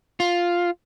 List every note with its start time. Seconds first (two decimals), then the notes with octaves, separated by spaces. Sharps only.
0.20 F4